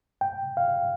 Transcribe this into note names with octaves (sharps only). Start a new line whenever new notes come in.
G5
F5